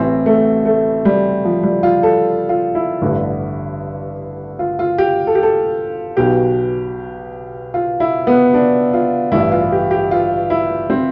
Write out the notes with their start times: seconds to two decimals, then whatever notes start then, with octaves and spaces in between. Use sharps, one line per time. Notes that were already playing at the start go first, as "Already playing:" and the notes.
Already playing: A1 A2 E3 C4
0.26 A3
0.65 A3
1.05 G3
1.45 F3
1.63 G3
1.83 F4
2.03 A4
2.49 F4
2.75 E4
3.02 A1 G2 D3
4.59 F4
4.79 F4
4.98 G4
5.27 A4
5.35 G4
5.43 A4
6.17 B1 B2 G4
7.74 F4
8.00 E4
8.27 B3
8.54 D4
8.93 F4
9.32 A1 G2 E3 E4
9.52 F4
9.72 G4
9.91 G4
10.11 F4
10.50 E4
10.90 C4